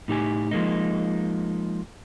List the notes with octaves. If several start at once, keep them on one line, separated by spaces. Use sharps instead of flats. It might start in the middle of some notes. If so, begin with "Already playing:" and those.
A2 D#4 G4 G#5
F3 G#3 A#3 D#4